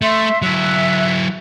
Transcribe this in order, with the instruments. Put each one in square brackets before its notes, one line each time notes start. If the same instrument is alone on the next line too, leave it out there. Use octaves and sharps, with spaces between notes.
[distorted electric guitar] A3 [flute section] E5 C6
[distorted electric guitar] F#3 E4 [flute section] E5 F#6